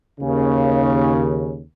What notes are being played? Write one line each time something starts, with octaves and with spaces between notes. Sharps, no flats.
D#2 C#3